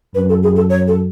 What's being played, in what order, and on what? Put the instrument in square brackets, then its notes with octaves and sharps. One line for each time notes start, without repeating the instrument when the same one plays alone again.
[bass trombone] F#2 [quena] B4
[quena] A4
G#4
A4
C#5
A4